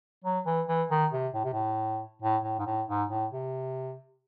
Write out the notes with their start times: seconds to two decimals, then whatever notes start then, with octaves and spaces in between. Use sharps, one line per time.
0.25 F#3
0.46 E3
0.68 E3
0.91 D#3
1.13 C3
1.34 A2
1.44 C3
1.53 A2
2.22 A2
2.44 A2
2.59 G#2
2.67 A2
2.88 G#2
3.10 A2
3.32 C3